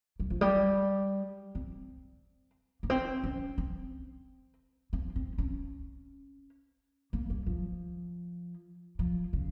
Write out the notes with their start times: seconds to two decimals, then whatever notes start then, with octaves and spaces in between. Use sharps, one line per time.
0.20 G3
0.30 F3
0.41 G3
1.55 C4
2.83 A#3
2.90 C4
3.24 C#4
3.58 C4
4.93 C4
5.16 C4
5.38 C#4
7.13 A#3
7.30 G3
7.46 F3
8.99 F3
9.33 C#3